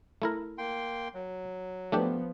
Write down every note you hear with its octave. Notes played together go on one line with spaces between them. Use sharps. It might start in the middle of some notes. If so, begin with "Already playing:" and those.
A3 E4 A#4
A#3 G5 C6
F#3
F3 A3 B3 D4 G4